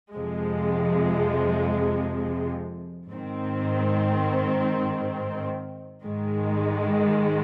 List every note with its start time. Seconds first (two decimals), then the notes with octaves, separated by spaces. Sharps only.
0.14 F2 C3 F3 G#3
3.09 G#2 D#3 C4
6.03 G#2 D#3 G#3